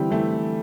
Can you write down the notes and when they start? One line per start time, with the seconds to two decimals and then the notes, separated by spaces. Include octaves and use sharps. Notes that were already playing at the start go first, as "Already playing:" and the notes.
Already playing: D3 E3 G3 C4 E4
0.11 E3 A3